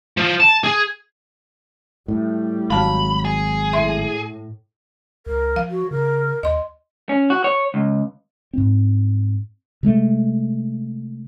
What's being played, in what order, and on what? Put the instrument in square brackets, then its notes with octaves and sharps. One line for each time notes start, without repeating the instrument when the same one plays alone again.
[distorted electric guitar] F3
A5
G#4
[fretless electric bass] A2 [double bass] G3
[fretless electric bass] G#1 F#3 [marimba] F5 A5 F6 [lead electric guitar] B5
[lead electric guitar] G#4
[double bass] A2 [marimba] E5 C6
[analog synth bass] C#2 [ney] A#4
[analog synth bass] F3 [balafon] F5
[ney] F#4
[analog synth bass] C#3 [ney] A#4
[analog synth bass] D#2 [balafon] D#5 C6
[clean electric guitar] C#4
F#4
C#5
C#2
[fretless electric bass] G#2 C4
C3 G#3 A3